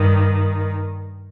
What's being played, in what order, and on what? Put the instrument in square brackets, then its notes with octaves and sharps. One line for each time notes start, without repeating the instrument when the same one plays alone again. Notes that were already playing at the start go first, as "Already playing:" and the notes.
Already playing: [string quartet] G2 D#3